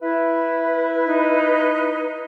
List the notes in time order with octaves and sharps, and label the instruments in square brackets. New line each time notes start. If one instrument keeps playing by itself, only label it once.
[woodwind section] E4 [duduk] B4
[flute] D#4